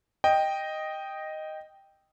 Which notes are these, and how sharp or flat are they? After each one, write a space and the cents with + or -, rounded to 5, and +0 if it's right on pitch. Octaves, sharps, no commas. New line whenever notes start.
D#5 +0 G5 +0